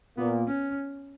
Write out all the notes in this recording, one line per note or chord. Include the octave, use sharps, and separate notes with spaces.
A#2 A#3 B3
C#4